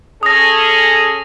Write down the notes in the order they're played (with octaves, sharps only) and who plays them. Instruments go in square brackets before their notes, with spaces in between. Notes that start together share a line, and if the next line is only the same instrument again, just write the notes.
[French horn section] C#4 G#4 A4 [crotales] D#6 A#6